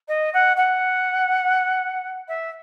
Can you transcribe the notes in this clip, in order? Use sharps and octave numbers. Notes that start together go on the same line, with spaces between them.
D#5
F#5
F#5
E5